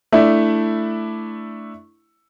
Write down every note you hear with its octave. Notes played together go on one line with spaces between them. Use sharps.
A3 D4 E4